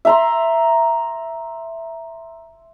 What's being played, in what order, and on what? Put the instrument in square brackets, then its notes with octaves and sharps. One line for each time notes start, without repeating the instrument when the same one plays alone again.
[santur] E5 A#5 C6